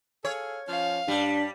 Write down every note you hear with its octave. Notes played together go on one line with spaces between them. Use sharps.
G#4 A4 C#5 F5
F3 C#4 F5
G2 G3 D4